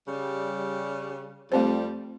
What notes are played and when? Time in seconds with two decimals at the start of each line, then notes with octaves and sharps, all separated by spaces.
0.08 C#3 G3
1.52 F2 G3 A3 C4 C5